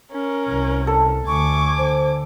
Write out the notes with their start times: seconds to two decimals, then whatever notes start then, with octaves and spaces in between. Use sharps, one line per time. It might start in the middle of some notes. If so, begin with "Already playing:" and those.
0.12 C#4 A#4
0.48 C2
0.87 A4
1.27 D2 G#5 C#6 D6
1.78 D3 C5